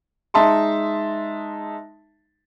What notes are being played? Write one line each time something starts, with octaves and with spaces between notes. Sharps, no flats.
G#3 D#4 E5 A5 C6